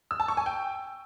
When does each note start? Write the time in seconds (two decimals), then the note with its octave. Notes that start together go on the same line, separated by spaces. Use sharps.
0.11 E6
0.20 A5
0.28 C#6
0.37 G#5
0.46 G5